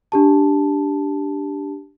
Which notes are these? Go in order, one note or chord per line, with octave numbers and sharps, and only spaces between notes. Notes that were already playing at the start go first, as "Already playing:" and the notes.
D4 G4 A5